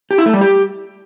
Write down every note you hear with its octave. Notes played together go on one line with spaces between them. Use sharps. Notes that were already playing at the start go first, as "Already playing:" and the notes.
G4
E4
A3
G3
G4